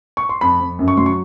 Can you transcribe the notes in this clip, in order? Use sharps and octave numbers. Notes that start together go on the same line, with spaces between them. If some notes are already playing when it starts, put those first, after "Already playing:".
C#6
C6
F2 B5
F2
F#2
C#6
F#3 C6
C#6